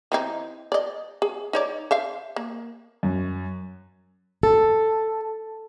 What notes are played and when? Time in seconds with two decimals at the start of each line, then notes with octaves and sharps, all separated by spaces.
0.12 E3 C4 D#4
0.72 D5 D#5
1.22 G#4
1.53 D#4 C#5 D5
1.91 C5 E5 F5
2.36 A#3
3.03 F#2
4.43 A4